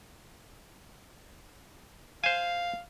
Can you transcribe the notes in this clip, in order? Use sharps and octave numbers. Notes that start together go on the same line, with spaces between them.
C5 F5 G#5